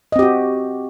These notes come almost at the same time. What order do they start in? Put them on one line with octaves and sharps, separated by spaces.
D#5 C4 G4 F#4